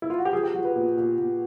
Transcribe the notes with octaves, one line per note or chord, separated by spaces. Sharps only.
E4
F4
F#4
G4
F3 G#4
G4
F3 F#4
B4
A#2
A#2
A#2